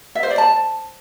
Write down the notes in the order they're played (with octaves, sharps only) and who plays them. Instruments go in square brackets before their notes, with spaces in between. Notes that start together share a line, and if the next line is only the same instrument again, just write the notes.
[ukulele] E5
C5
D5
A5